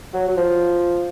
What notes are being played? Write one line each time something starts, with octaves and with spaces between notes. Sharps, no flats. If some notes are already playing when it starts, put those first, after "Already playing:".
F#3
F#3
F3